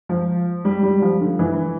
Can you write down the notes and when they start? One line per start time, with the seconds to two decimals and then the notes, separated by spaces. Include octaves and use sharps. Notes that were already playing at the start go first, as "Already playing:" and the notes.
0.09 F3
0.65 G3
0.83 G3
1.02 F3
1.20 D3
1.39 E3